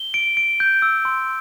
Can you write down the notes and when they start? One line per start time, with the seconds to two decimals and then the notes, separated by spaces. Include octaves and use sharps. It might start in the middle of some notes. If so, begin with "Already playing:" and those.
Already playing: G7
0.14 D7
0.37 D7
0.60 G6
0.82 E6
1.05 C6